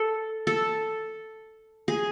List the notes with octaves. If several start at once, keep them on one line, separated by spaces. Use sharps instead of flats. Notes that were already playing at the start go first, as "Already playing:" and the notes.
Already playing: A4
A4
G#4